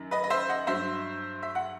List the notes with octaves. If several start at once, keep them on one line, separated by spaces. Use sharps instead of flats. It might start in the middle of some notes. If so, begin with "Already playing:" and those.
Already playing: F#2 D#3
B4 D#5
D#5
C5 E5
D#5 F#5
G2 F#3 C5 E5
E5
F#5